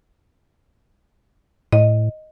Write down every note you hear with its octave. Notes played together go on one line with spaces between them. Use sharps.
A2 D#5